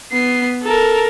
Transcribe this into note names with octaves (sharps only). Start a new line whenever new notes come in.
B3 C7
A4 A#4